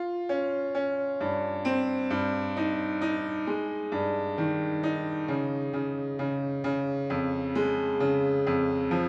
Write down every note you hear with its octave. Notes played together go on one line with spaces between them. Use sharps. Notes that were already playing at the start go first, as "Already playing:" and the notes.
Already playing: F4
C#4
C#4
G2
C4
G2
D#4
D#4
G#3
G2
D#3
D#4
C#3
C#3
C#3
C#3
F2
G#3
C#3
F2
F3